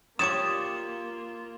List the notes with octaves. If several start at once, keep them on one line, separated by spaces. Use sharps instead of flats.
A#3 F4 G4 C#5 D5 D6 D#6 E7